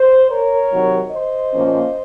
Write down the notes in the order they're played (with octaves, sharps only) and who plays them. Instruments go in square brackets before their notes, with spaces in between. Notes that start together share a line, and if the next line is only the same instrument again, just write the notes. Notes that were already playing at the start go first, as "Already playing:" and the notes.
Already playing: [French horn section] C5
A#4 C#5
C3 D#3 F#3
C5 D#5
A#2 F3 A#3 C#4